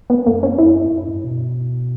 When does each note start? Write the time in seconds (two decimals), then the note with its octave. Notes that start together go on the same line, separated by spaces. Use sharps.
0.10 B3
0.26 F#2 A#3
0.43 C#4
0.58 F#2 E4
0.75 F#2
0.87 G2
0.91 F#2
1.02 F#2
1.08 G2
1.24 B2